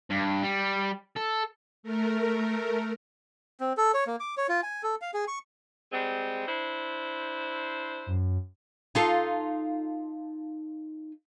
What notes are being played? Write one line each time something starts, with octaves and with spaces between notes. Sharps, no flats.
G2
G3
A4
A3 A#4
C4
A4
C#5
A#3
D6
C#5
F4
G#5
A4
F5
G#4
C#6
G3 G#3 C4
D4 E4 C5
F#2
D#4 F4 A4